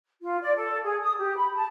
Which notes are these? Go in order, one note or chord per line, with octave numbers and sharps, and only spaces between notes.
F4
D5
A4
G#4
D#6
G4
B5
A5